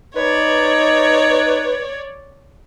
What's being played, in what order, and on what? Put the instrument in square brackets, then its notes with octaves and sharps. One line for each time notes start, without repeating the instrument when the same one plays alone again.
[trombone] D#4 [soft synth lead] B4 [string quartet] C#5 D5